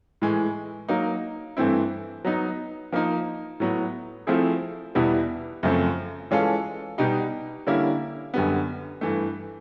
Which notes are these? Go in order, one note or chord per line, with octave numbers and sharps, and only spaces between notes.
A2 E3 G#3
F#3 A#3 D#4
G2 E3 A3 C4 E4
F#3 B3 D#4
F3 A#3 D#4
A2 F#3 B3
F3 A3 C4 E4 G#4
E2 B2 G3 B3 E4
F#2 C#3 F3 A3 C4
E3 G#3 C#4 F4 A4
B2 G3 B3 D#4 G4
D3 G3 A#3 C#4 E4
F#2 D3 G3 B3
G2 E3 A3